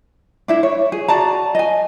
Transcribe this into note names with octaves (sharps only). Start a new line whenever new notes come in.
D4 E4 E5
C#5
G#4
F#4 D5 A5 A#5
D#5 G#5